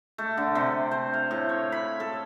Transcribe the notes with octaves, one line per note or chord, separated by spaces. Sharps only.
A3
D3
C3
C5
F5
A2
C#5
B5
A4